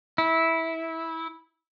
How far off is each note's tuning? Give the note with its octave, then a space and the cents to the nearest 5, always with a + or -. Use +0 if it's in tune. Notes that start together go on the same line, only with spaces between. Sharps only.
E4 -15